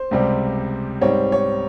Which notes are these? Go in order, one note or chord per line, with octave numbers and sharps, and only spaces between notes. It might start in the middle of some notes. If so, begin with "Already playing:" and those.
Already playing: C5
C#2 C3 G3 C4
G#2 G3 C4 C#5
C#5